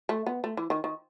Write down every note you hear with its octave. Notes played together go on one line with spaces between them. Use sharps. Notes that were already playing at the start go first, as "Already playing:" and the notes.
A3
B3
A3
E3
D#3
D#3